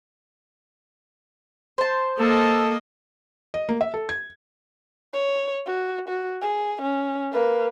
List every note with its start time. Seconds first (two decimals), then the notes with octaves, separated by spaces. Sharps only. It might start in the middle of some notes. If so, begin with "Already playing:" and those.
1.78 C5 A5
2.19 A#3 A4 D#5
3.54 D#5
3.69 A#3
3.81 E5
3.94 A4
4.09 G#6
5.13 C#5
5.66 F#4
6.08 F#4
6.42 G#4
6.81 C#4
7.31 A#3 B4